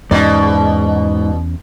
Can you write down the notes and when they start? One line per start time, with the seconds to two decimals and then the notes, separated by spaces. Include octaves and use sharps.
0.11 E2 G#2 B2 C#4 D5